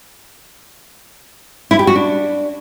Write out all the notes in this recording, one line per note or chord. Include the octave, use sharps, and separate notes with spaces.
E4
G4
F#4
D4